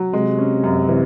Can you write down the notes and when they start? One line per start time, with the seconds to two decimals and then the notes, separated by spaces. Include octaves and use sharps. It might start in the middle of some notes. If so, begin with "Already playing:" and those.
Already playing: F#3
0.13 C3 G#3
0.38 C#4
0.64 F#2
0.89 E3